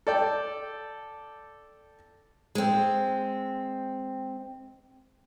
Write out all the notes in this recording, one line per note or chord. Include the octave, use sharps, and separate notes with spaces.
A4 D5 G5
G#3 C4